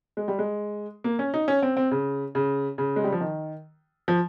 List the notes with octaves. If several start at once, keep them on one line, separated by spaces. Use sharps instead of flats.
G#3
G3
G#3
A#3
C#4
D#4
C#4
C4
C4
C#3
C#3
C#3
G#3
G3
F3
D#3
F3